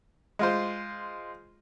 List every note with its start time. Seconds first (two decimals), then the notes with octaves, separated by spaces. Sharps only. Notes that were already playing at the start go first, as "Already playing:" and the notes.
0.39 G#3 F4 C5